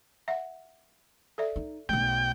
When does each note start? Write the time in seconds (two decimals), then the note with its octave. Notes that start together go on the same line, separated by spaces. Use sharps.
0.28 E5 F#5
1.38 A4 D5 E5
1.56 D#4
1.89 B1 A3 G5